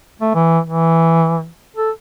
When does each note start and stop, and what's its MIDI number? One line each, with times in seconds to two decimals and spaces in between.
0.21 0.30 57
0.35 0.59 52
0.67 1.46 52
1.76 1.90 69